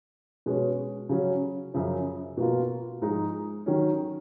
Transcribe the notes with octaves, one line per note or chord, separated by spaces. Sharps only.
B2 G#3 C#4
C#3 F#3 C#4
F#2 C#3 F3
B2 A#3 F4
G#2 F3 G#3 D#4
D#3 F#3 C#4